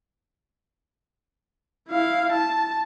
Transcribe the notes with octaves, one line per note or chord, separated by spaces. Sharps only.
E4 F5
A5